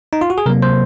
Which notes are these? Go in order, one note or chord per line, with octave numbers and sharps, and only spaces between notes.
D#4
F4
F#4
G#4
C3 F#3 A#3 A#4
C5